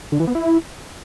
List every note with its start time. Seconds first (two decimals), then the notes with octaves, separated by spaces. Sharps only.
0.12 D3
0.20 E3
0.27 B3
0.35 E4